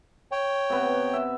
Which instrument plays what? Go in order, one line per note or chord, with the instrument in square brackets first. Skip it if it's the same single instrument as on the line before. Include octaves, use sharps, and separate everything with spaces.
[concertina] C#5 G5
[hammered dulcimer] C3 B3
E5